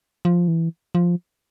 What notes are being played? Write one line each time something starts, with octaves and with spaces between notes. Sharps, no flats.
F3
E3
F3